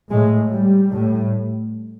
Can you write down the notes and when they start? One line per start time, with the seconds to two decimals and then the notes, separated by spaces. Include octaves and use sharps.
0.10 A2 G#3
0.51 G3
0.90 A2